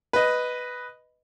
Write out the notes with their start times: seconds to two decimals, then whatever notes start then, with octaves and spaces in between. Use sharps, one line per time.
0.13 B4 D#5